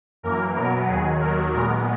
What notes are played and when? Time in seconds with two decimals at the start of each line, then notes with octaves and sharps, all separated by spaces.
0.23 F#2 E3 A#3 A#4
0.55 B2 F#3 B3 A#4
0.88 D#2 D#3 F#3 G#4
1.20 D#2 D#3 F#3 A#4
1.52 A#2 G#3 B3 A#4